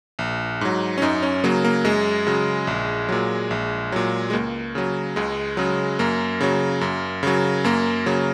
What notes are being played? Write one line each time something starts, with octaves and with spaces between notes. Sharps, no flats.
A#1
G#2 F#3
C#4
F#2 D#4
C#4
C#3 F#3 A#3
A#3
F#2 G#3
C#3 F#3
A#1
A#2 F#3
A#1
A#2 F#3
G#3
C#2 A#3
C#3 F#3
C#2 G#3
C#3 F#3
F#2 A#3
C#3 F#3
F#2
C#3 F#3
F#2 A#3
C#3 F#3